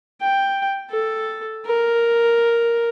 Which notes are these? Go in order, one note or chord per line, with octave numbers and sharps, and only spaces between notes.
G5
A4
A#4